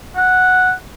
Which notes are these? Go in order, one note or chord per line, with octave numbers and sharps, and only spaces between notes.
F#5